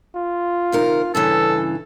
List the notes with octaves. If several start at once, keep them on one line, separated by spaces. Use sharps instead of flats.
F4
C3 D#3 A#4
G2 C#3 E3 C#4 A4